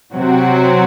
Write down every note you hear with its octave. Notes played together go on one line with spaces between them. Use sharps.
C3 F#3 C4 F#4